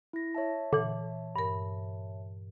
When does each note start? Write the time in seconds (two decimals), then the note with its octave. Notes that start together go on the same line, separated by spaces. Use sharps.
0.13 E4 A#6
0.35 C#5 E5 A5
0.73 A#2 D3 E3
1.36 G2 A#4